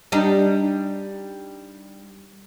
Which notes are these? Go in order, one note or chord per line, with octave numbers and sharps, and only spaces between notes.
G3 D4 D#4